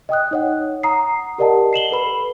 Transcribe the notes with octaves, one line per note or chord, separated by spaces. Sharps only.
D#5 G5 D#6 F#6
D#4 C#5 F#5
F#5 A#5 D#6 C7
G4 A#4 D5 D#5 F#5 A5
C7 E7 F#7 G7
A4 B4 B5